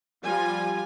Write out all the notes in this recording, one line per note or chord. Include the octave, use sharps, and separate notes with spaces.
F3 G3 F4 G#5